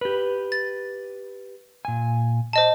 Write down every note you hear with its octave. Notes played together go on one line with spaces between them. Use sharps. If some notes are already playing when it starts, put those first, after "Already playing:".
G4 B4
A6
A#2 G#5
C5 D#5 A5